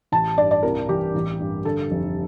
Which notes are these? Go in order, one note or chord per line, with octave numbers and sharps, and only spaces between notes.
A1 A5
G2 D5
D5
C2 A#4
E3 G4
A1
G2
D3 A4
F1